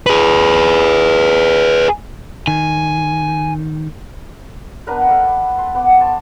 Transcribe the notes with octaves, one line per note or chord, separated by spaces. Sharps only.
G#4 B4
D#3 G#5
B3 D4 A#4 B4
D4 A4
D5 B5
C6
B3 F#5 D6
C5 G#5 A5